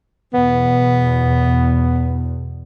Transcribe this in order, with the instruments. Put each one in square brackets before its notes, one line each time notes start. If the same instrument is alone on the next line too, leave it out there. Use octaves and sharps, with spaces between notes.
[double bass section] E2 B2 [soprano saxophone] B3